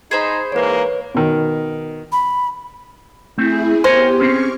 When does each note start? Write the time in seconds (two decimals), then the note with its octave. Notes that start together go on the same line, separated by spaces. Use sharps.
0.11 D#4 G#4 C5 B5
0.52 G#2 E3 A#3 B4 C#5
1.14 B2 D#3
2.12 B5
3.38 A3 C4 E4 G#4
3.84 B3 G4 A#4 C5 C#5 G#5
4.20 C4 C#4 G#4 C#6 D6 F6